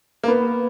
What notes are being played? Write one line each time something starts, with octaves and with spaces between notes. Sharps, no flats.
A#3
B3